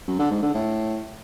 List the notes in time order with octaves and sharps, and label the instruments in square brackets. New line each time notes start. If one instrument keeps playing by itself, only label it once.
[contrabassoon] F#2
D3
G#2
D3
A2